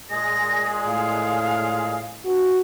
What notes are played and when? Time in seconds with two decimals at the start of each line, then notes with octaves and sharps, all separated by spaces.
0.10 A#2 G#3 G#4 A#6
0.87 A2 F5
2.25 G2 E3 F#4